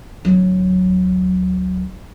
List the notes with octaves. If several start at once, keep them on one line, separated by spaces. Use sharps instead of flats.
D1 F#3